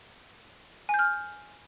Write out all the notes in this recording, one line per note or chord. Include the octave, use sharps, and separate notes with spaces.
G#5 F6 G6